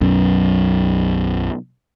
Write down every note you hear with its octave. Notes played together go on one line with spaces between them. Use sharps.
B1 F#2